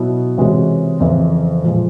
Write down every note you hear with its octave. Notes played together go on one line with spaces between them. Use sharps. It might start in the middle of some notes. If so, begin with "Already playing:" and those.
Already playing: B2 F#3 B3 E4
C3 E3 G#3 C#4 F#4
F2 C#3 E3
A#2 F3 G#3